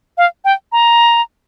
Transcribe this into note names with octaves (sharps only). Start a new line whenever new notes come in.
F5
G5
A#5